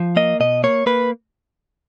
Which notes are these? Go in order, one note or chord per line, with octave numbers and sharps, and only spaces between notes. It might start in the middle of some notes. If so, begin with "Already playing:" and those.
Already playing: F3
A#3 D#5
B2 D#5
A#3 C#5
A#3 B4